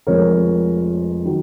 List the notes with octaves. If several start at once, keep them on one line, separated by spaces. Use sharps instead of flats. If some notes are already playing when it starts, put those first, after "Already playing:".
F1 F2 F3 G#3 A#4 C#5
D#3 F#3